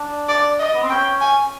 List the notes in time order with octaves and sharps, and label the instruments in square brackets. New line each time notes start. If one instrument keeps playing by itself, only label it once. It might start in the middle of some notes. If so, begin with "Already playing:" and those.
Already playing: [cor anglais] D4
[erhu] D5
D#5
[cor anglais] B3
C4
[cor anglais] C#4 [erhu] G5
[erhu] G#5